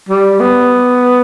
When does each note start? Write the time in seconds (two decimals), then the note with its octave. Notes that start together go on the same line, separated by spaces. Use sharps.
0.09 G3
0.40 B3